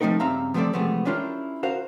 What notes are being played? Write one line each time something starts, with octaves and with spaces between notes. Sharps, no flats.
F3 A3 C4 D#4 A#4
G2 C#3 C4 E5 F5 A#5
F3 A3 B3 C4 A4 D5
C3 E3 F3 G#3 A3 B3
C#4 D4 E4 F4 G4 A#4
F#4 A#4 C5 F5